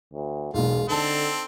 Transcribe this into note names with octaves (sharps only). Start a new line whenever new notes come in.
D2
E1 B1 G#3 F4
D3 C4 D#4 A4 A5